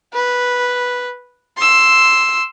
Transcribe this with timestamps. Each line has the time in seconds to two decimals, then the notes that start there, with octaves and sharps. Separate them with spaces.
0.13 B4
1.57 C6 E6